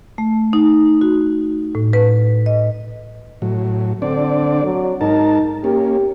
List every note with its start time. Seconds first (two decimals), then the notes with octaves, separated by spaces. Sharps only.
0.18 A3
0.53 D#4
1.01 F#4
1.75 A2
1.93 B4
2.46 D#5
3.42 A2 F#3
4.02 D3 C4 D4 D5
4.63 F#3
5.01 G#2 D#4 A#4 A5
5.64 A#3 C#4 G4